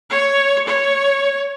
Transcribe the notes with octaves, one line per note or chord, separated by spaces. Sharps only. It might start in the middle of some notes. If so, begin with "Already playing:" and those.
C#5
C#5